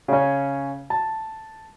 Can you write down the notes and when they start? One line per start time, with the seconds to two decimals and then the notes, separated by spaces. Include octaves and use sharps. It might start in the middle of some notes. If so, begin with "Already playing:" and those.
0.08 C#3 C#4
0.90 A5